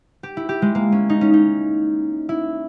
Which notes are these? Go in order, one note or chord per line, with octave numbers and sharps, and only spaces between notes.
G4
E4
G4
G#3
A#3
C#4
D#4
C#4
D#4
E4